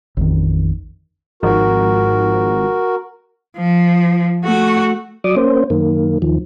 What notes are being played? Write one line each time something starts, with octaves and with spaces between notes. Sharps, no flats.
A1 F2 D#3
G#1 G#2 F3 F#4 A#4
F3
A3 F#4
F#3 D5 D6 D#6
A#3 C#4 C5
F#2 D#3 A#3
D#2 D#3 F3